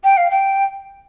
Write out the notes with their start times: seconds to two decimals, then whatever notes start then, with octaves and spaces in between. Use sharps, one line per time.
0.03 G5
0.17 F5
0.30 G5